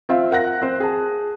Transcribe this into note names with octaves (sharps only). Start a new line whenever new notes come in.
C4 F4 E5 F5
A#4 F#5 F#6 A#6
C4 C5
G#4 A5